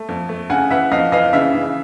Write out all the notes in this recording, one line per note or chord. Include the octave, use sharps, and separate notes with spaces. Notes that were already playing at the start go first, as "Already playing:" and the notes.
Already playing: A3
F2
A3
C#3 F#5 G#5
E3 E5 F#5
F2 D#5 F5
E3 D#5 F5
C#3 E5
C#3